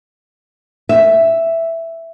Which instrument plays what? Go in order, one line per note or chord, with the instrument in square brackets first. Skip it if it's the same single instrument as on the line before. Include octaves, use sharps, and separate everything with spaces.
[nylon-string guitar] E5